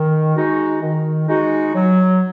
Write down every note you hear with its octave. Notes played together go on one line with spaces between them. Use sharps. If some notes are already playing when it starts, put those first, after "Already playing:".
Already playing: D#3
G#3 D#4 F#4
D#3
G#3 D#4 F#4
F#3